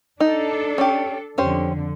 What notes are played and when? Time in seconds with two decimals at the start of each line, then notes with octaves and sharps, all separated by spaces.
0.20 D4 D#4 A4
0.78 C#4 G4
1.38 F2 D3 C#4 G4 C5